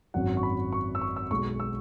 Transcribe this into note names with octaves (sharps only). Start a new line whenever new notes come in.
G#1 F#2 F#3 F#5
C#6
B5
C#6
E6
C#6
E6
B1 B2 G#3 C#6
E6